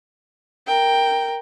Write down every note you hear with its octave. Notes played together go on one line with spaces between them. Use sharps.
A#4 G5